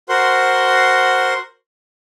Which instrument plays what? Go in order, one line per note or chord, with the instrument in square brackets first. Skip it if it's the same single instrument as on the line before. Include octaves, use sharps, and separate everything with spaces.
[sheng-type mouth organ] F#4 A#4 C5 F#5 C6